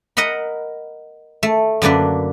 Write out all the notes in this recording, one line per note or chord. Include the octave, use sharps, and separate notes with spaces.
A#4 D#5 F#5 A#5 B5
A3
F#2 D3 A#3 D4 B4